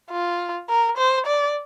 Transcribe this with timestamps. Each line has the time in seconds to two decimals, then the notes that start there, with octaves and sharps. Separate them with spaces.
0.11 F4
0.69 A#4
0.98 C5
1.27 D5